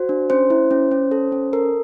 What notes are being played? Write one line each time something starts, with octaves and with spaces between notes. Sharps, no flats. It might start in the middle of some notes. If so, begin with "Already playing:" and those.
Already playing: F#4 C5
D4
C#4 C5
E4
C#4
C#4
A4
C#4
A4 A#4